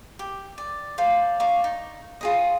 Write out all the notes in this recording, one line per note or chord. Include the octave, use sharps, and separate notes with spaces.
G4
D5
C5 D5 F5 A5
D5 F5 A#5 C#6
D#4
F4 G#4 D#5